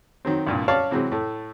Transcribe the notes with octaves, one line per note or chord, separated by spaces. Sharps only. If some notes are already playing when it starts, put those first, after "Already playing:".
D#3 F#3 C4
C2 G2 A#2
C#4 C#5 D5 F5 A5
C3 E3 F#3 G#3 C4
A2 A3